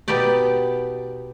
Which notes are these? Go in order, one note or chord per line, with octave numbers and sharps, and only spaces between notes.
B2 B3 D#4 G4 D5